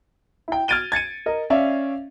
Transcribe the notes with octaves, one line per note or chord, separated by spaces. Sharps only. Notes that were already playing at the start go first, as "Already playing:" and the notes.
E4 G5
F6 G#6 A6 D7 D#7 G7
G#6 A6 C#7 D#7
A#4 D#5
C#4 D5 E5 F5